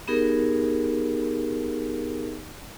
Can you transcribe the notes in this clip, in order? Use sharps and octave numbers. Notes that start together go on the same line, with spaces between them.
B3 D#4 G4 G#4 A#4